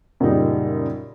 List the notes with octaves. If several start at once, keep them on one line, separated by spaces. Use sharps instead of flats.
F#2 A#2 C#3 G3 D#4